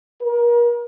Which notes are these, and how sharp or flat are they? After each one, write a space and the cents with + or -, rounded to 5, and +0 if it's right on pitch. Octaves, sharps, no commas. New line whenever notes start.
A#4 +35